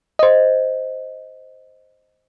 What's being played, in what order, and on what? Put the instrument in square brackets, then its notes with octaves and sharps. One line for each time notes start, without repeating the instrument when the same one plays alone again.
[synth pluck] C5 D#5